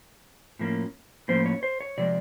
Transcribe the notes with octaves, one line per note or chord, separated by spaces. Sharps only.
A2 F3 A#3 C#4
A2 F3 A#3 C#4 C5
C#5
C5
C#5
C3 F3 G#3 D5